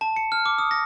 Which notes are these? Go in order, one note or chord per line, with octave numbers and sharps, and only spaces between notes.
A5
C#7
F6
D6
D#6
A#6